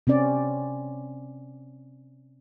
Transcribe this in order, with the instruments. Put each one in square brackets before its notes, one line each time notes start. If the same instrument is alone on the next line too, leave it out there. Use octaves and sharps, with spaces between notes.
[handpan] C3 C4 C#4 D5